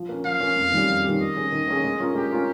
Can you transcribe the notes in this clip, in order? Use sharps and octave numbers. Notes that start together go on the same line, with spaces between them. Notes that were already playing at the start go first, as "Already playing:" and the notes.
Already playing: F3
A#3 C#4
F3 F5
A#3 C#4
F2
D#3 G3 C#4 G4
F2
D#3 G3 C#4 G4
D#3 D#5
A#3 C#4 G#4
D#3
A#3 C#4 G#4
G#3
C#4 F4 A#4
G#3 G4
C#4 F4 A#4